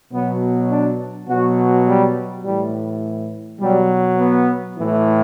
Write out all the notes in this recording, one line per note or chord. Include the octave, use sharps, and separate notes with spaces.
B2 F#3 B3
D4
B2 F#3 F#4
G3
A2 E3 G3
B2 F#3 G3
B3
A2 E3